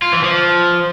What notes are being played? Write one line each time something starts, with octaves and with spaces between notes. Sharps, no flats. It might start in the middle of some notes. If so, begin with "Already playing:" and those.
F4
E3
F3